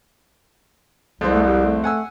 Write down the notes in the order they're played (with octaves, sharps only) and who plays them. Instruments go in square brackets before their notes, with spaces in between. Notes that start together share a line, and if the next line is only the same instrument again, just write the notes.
[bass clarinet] C2 [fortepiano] F2 G#3 C4
[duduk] A3
G4
A3
[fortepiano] F#5 G#5 E6